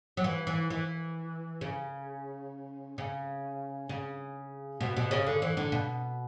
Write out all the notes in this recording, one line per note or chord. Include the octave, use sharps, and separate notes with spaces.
F#3
E3
E3
E3
C#3
C#3
C#3
B2
B2
C#3
D3
E3
D3
B2